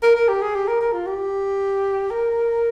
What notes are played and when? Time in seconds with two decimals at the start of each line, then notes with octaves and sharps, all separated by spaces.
0.03 A#4
0.15 A#4
0.28 G4
0.41 G#4
0.55 G4
0.68 A#4
0.81 A#4
0.93 F4
1.07 G4
2.10 A#4